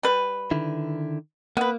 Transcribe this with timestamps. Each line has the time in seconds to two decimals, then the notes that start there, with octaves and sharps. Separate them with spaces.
0.03 G3 B4
0.51 D3 D#3 E4
1.57 A#3 B3 B4